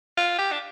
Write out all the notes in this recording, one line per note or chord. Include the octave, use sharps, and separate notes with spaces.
F4
G4
D4